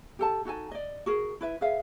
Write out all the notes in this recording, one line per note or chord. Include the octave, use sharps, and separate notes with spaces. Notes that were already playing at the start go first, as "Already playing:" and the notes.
G4 A4 A5
D#4 F#4 A4 G#5
D5 D#5
F#4 G#4 A#4
E4 B4 E5
G#4 B4 E5 F5